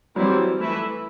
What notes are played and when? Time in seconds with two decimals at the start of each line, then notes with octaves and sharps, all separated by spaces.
0.16 E3 F#3 G3 C4 E4
0.59 E3 A3 E4 B4 E5